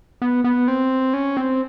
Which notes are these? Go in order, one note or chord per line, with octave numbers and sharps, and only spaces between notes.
B3
B3
C4
C#4
C4